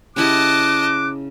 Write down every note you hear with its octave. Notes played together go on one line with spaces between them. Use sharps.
C#3 E4 G4 D#5 A5 D6 F#6